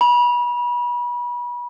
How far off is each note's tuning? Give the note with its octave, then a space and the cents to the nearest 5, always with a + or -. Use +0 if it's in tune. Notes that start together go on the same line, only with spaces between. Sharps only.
B5 -30